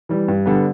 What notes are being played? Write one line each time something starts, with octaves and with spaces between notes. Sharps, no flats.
E3 G3
G2
D3 G3 B3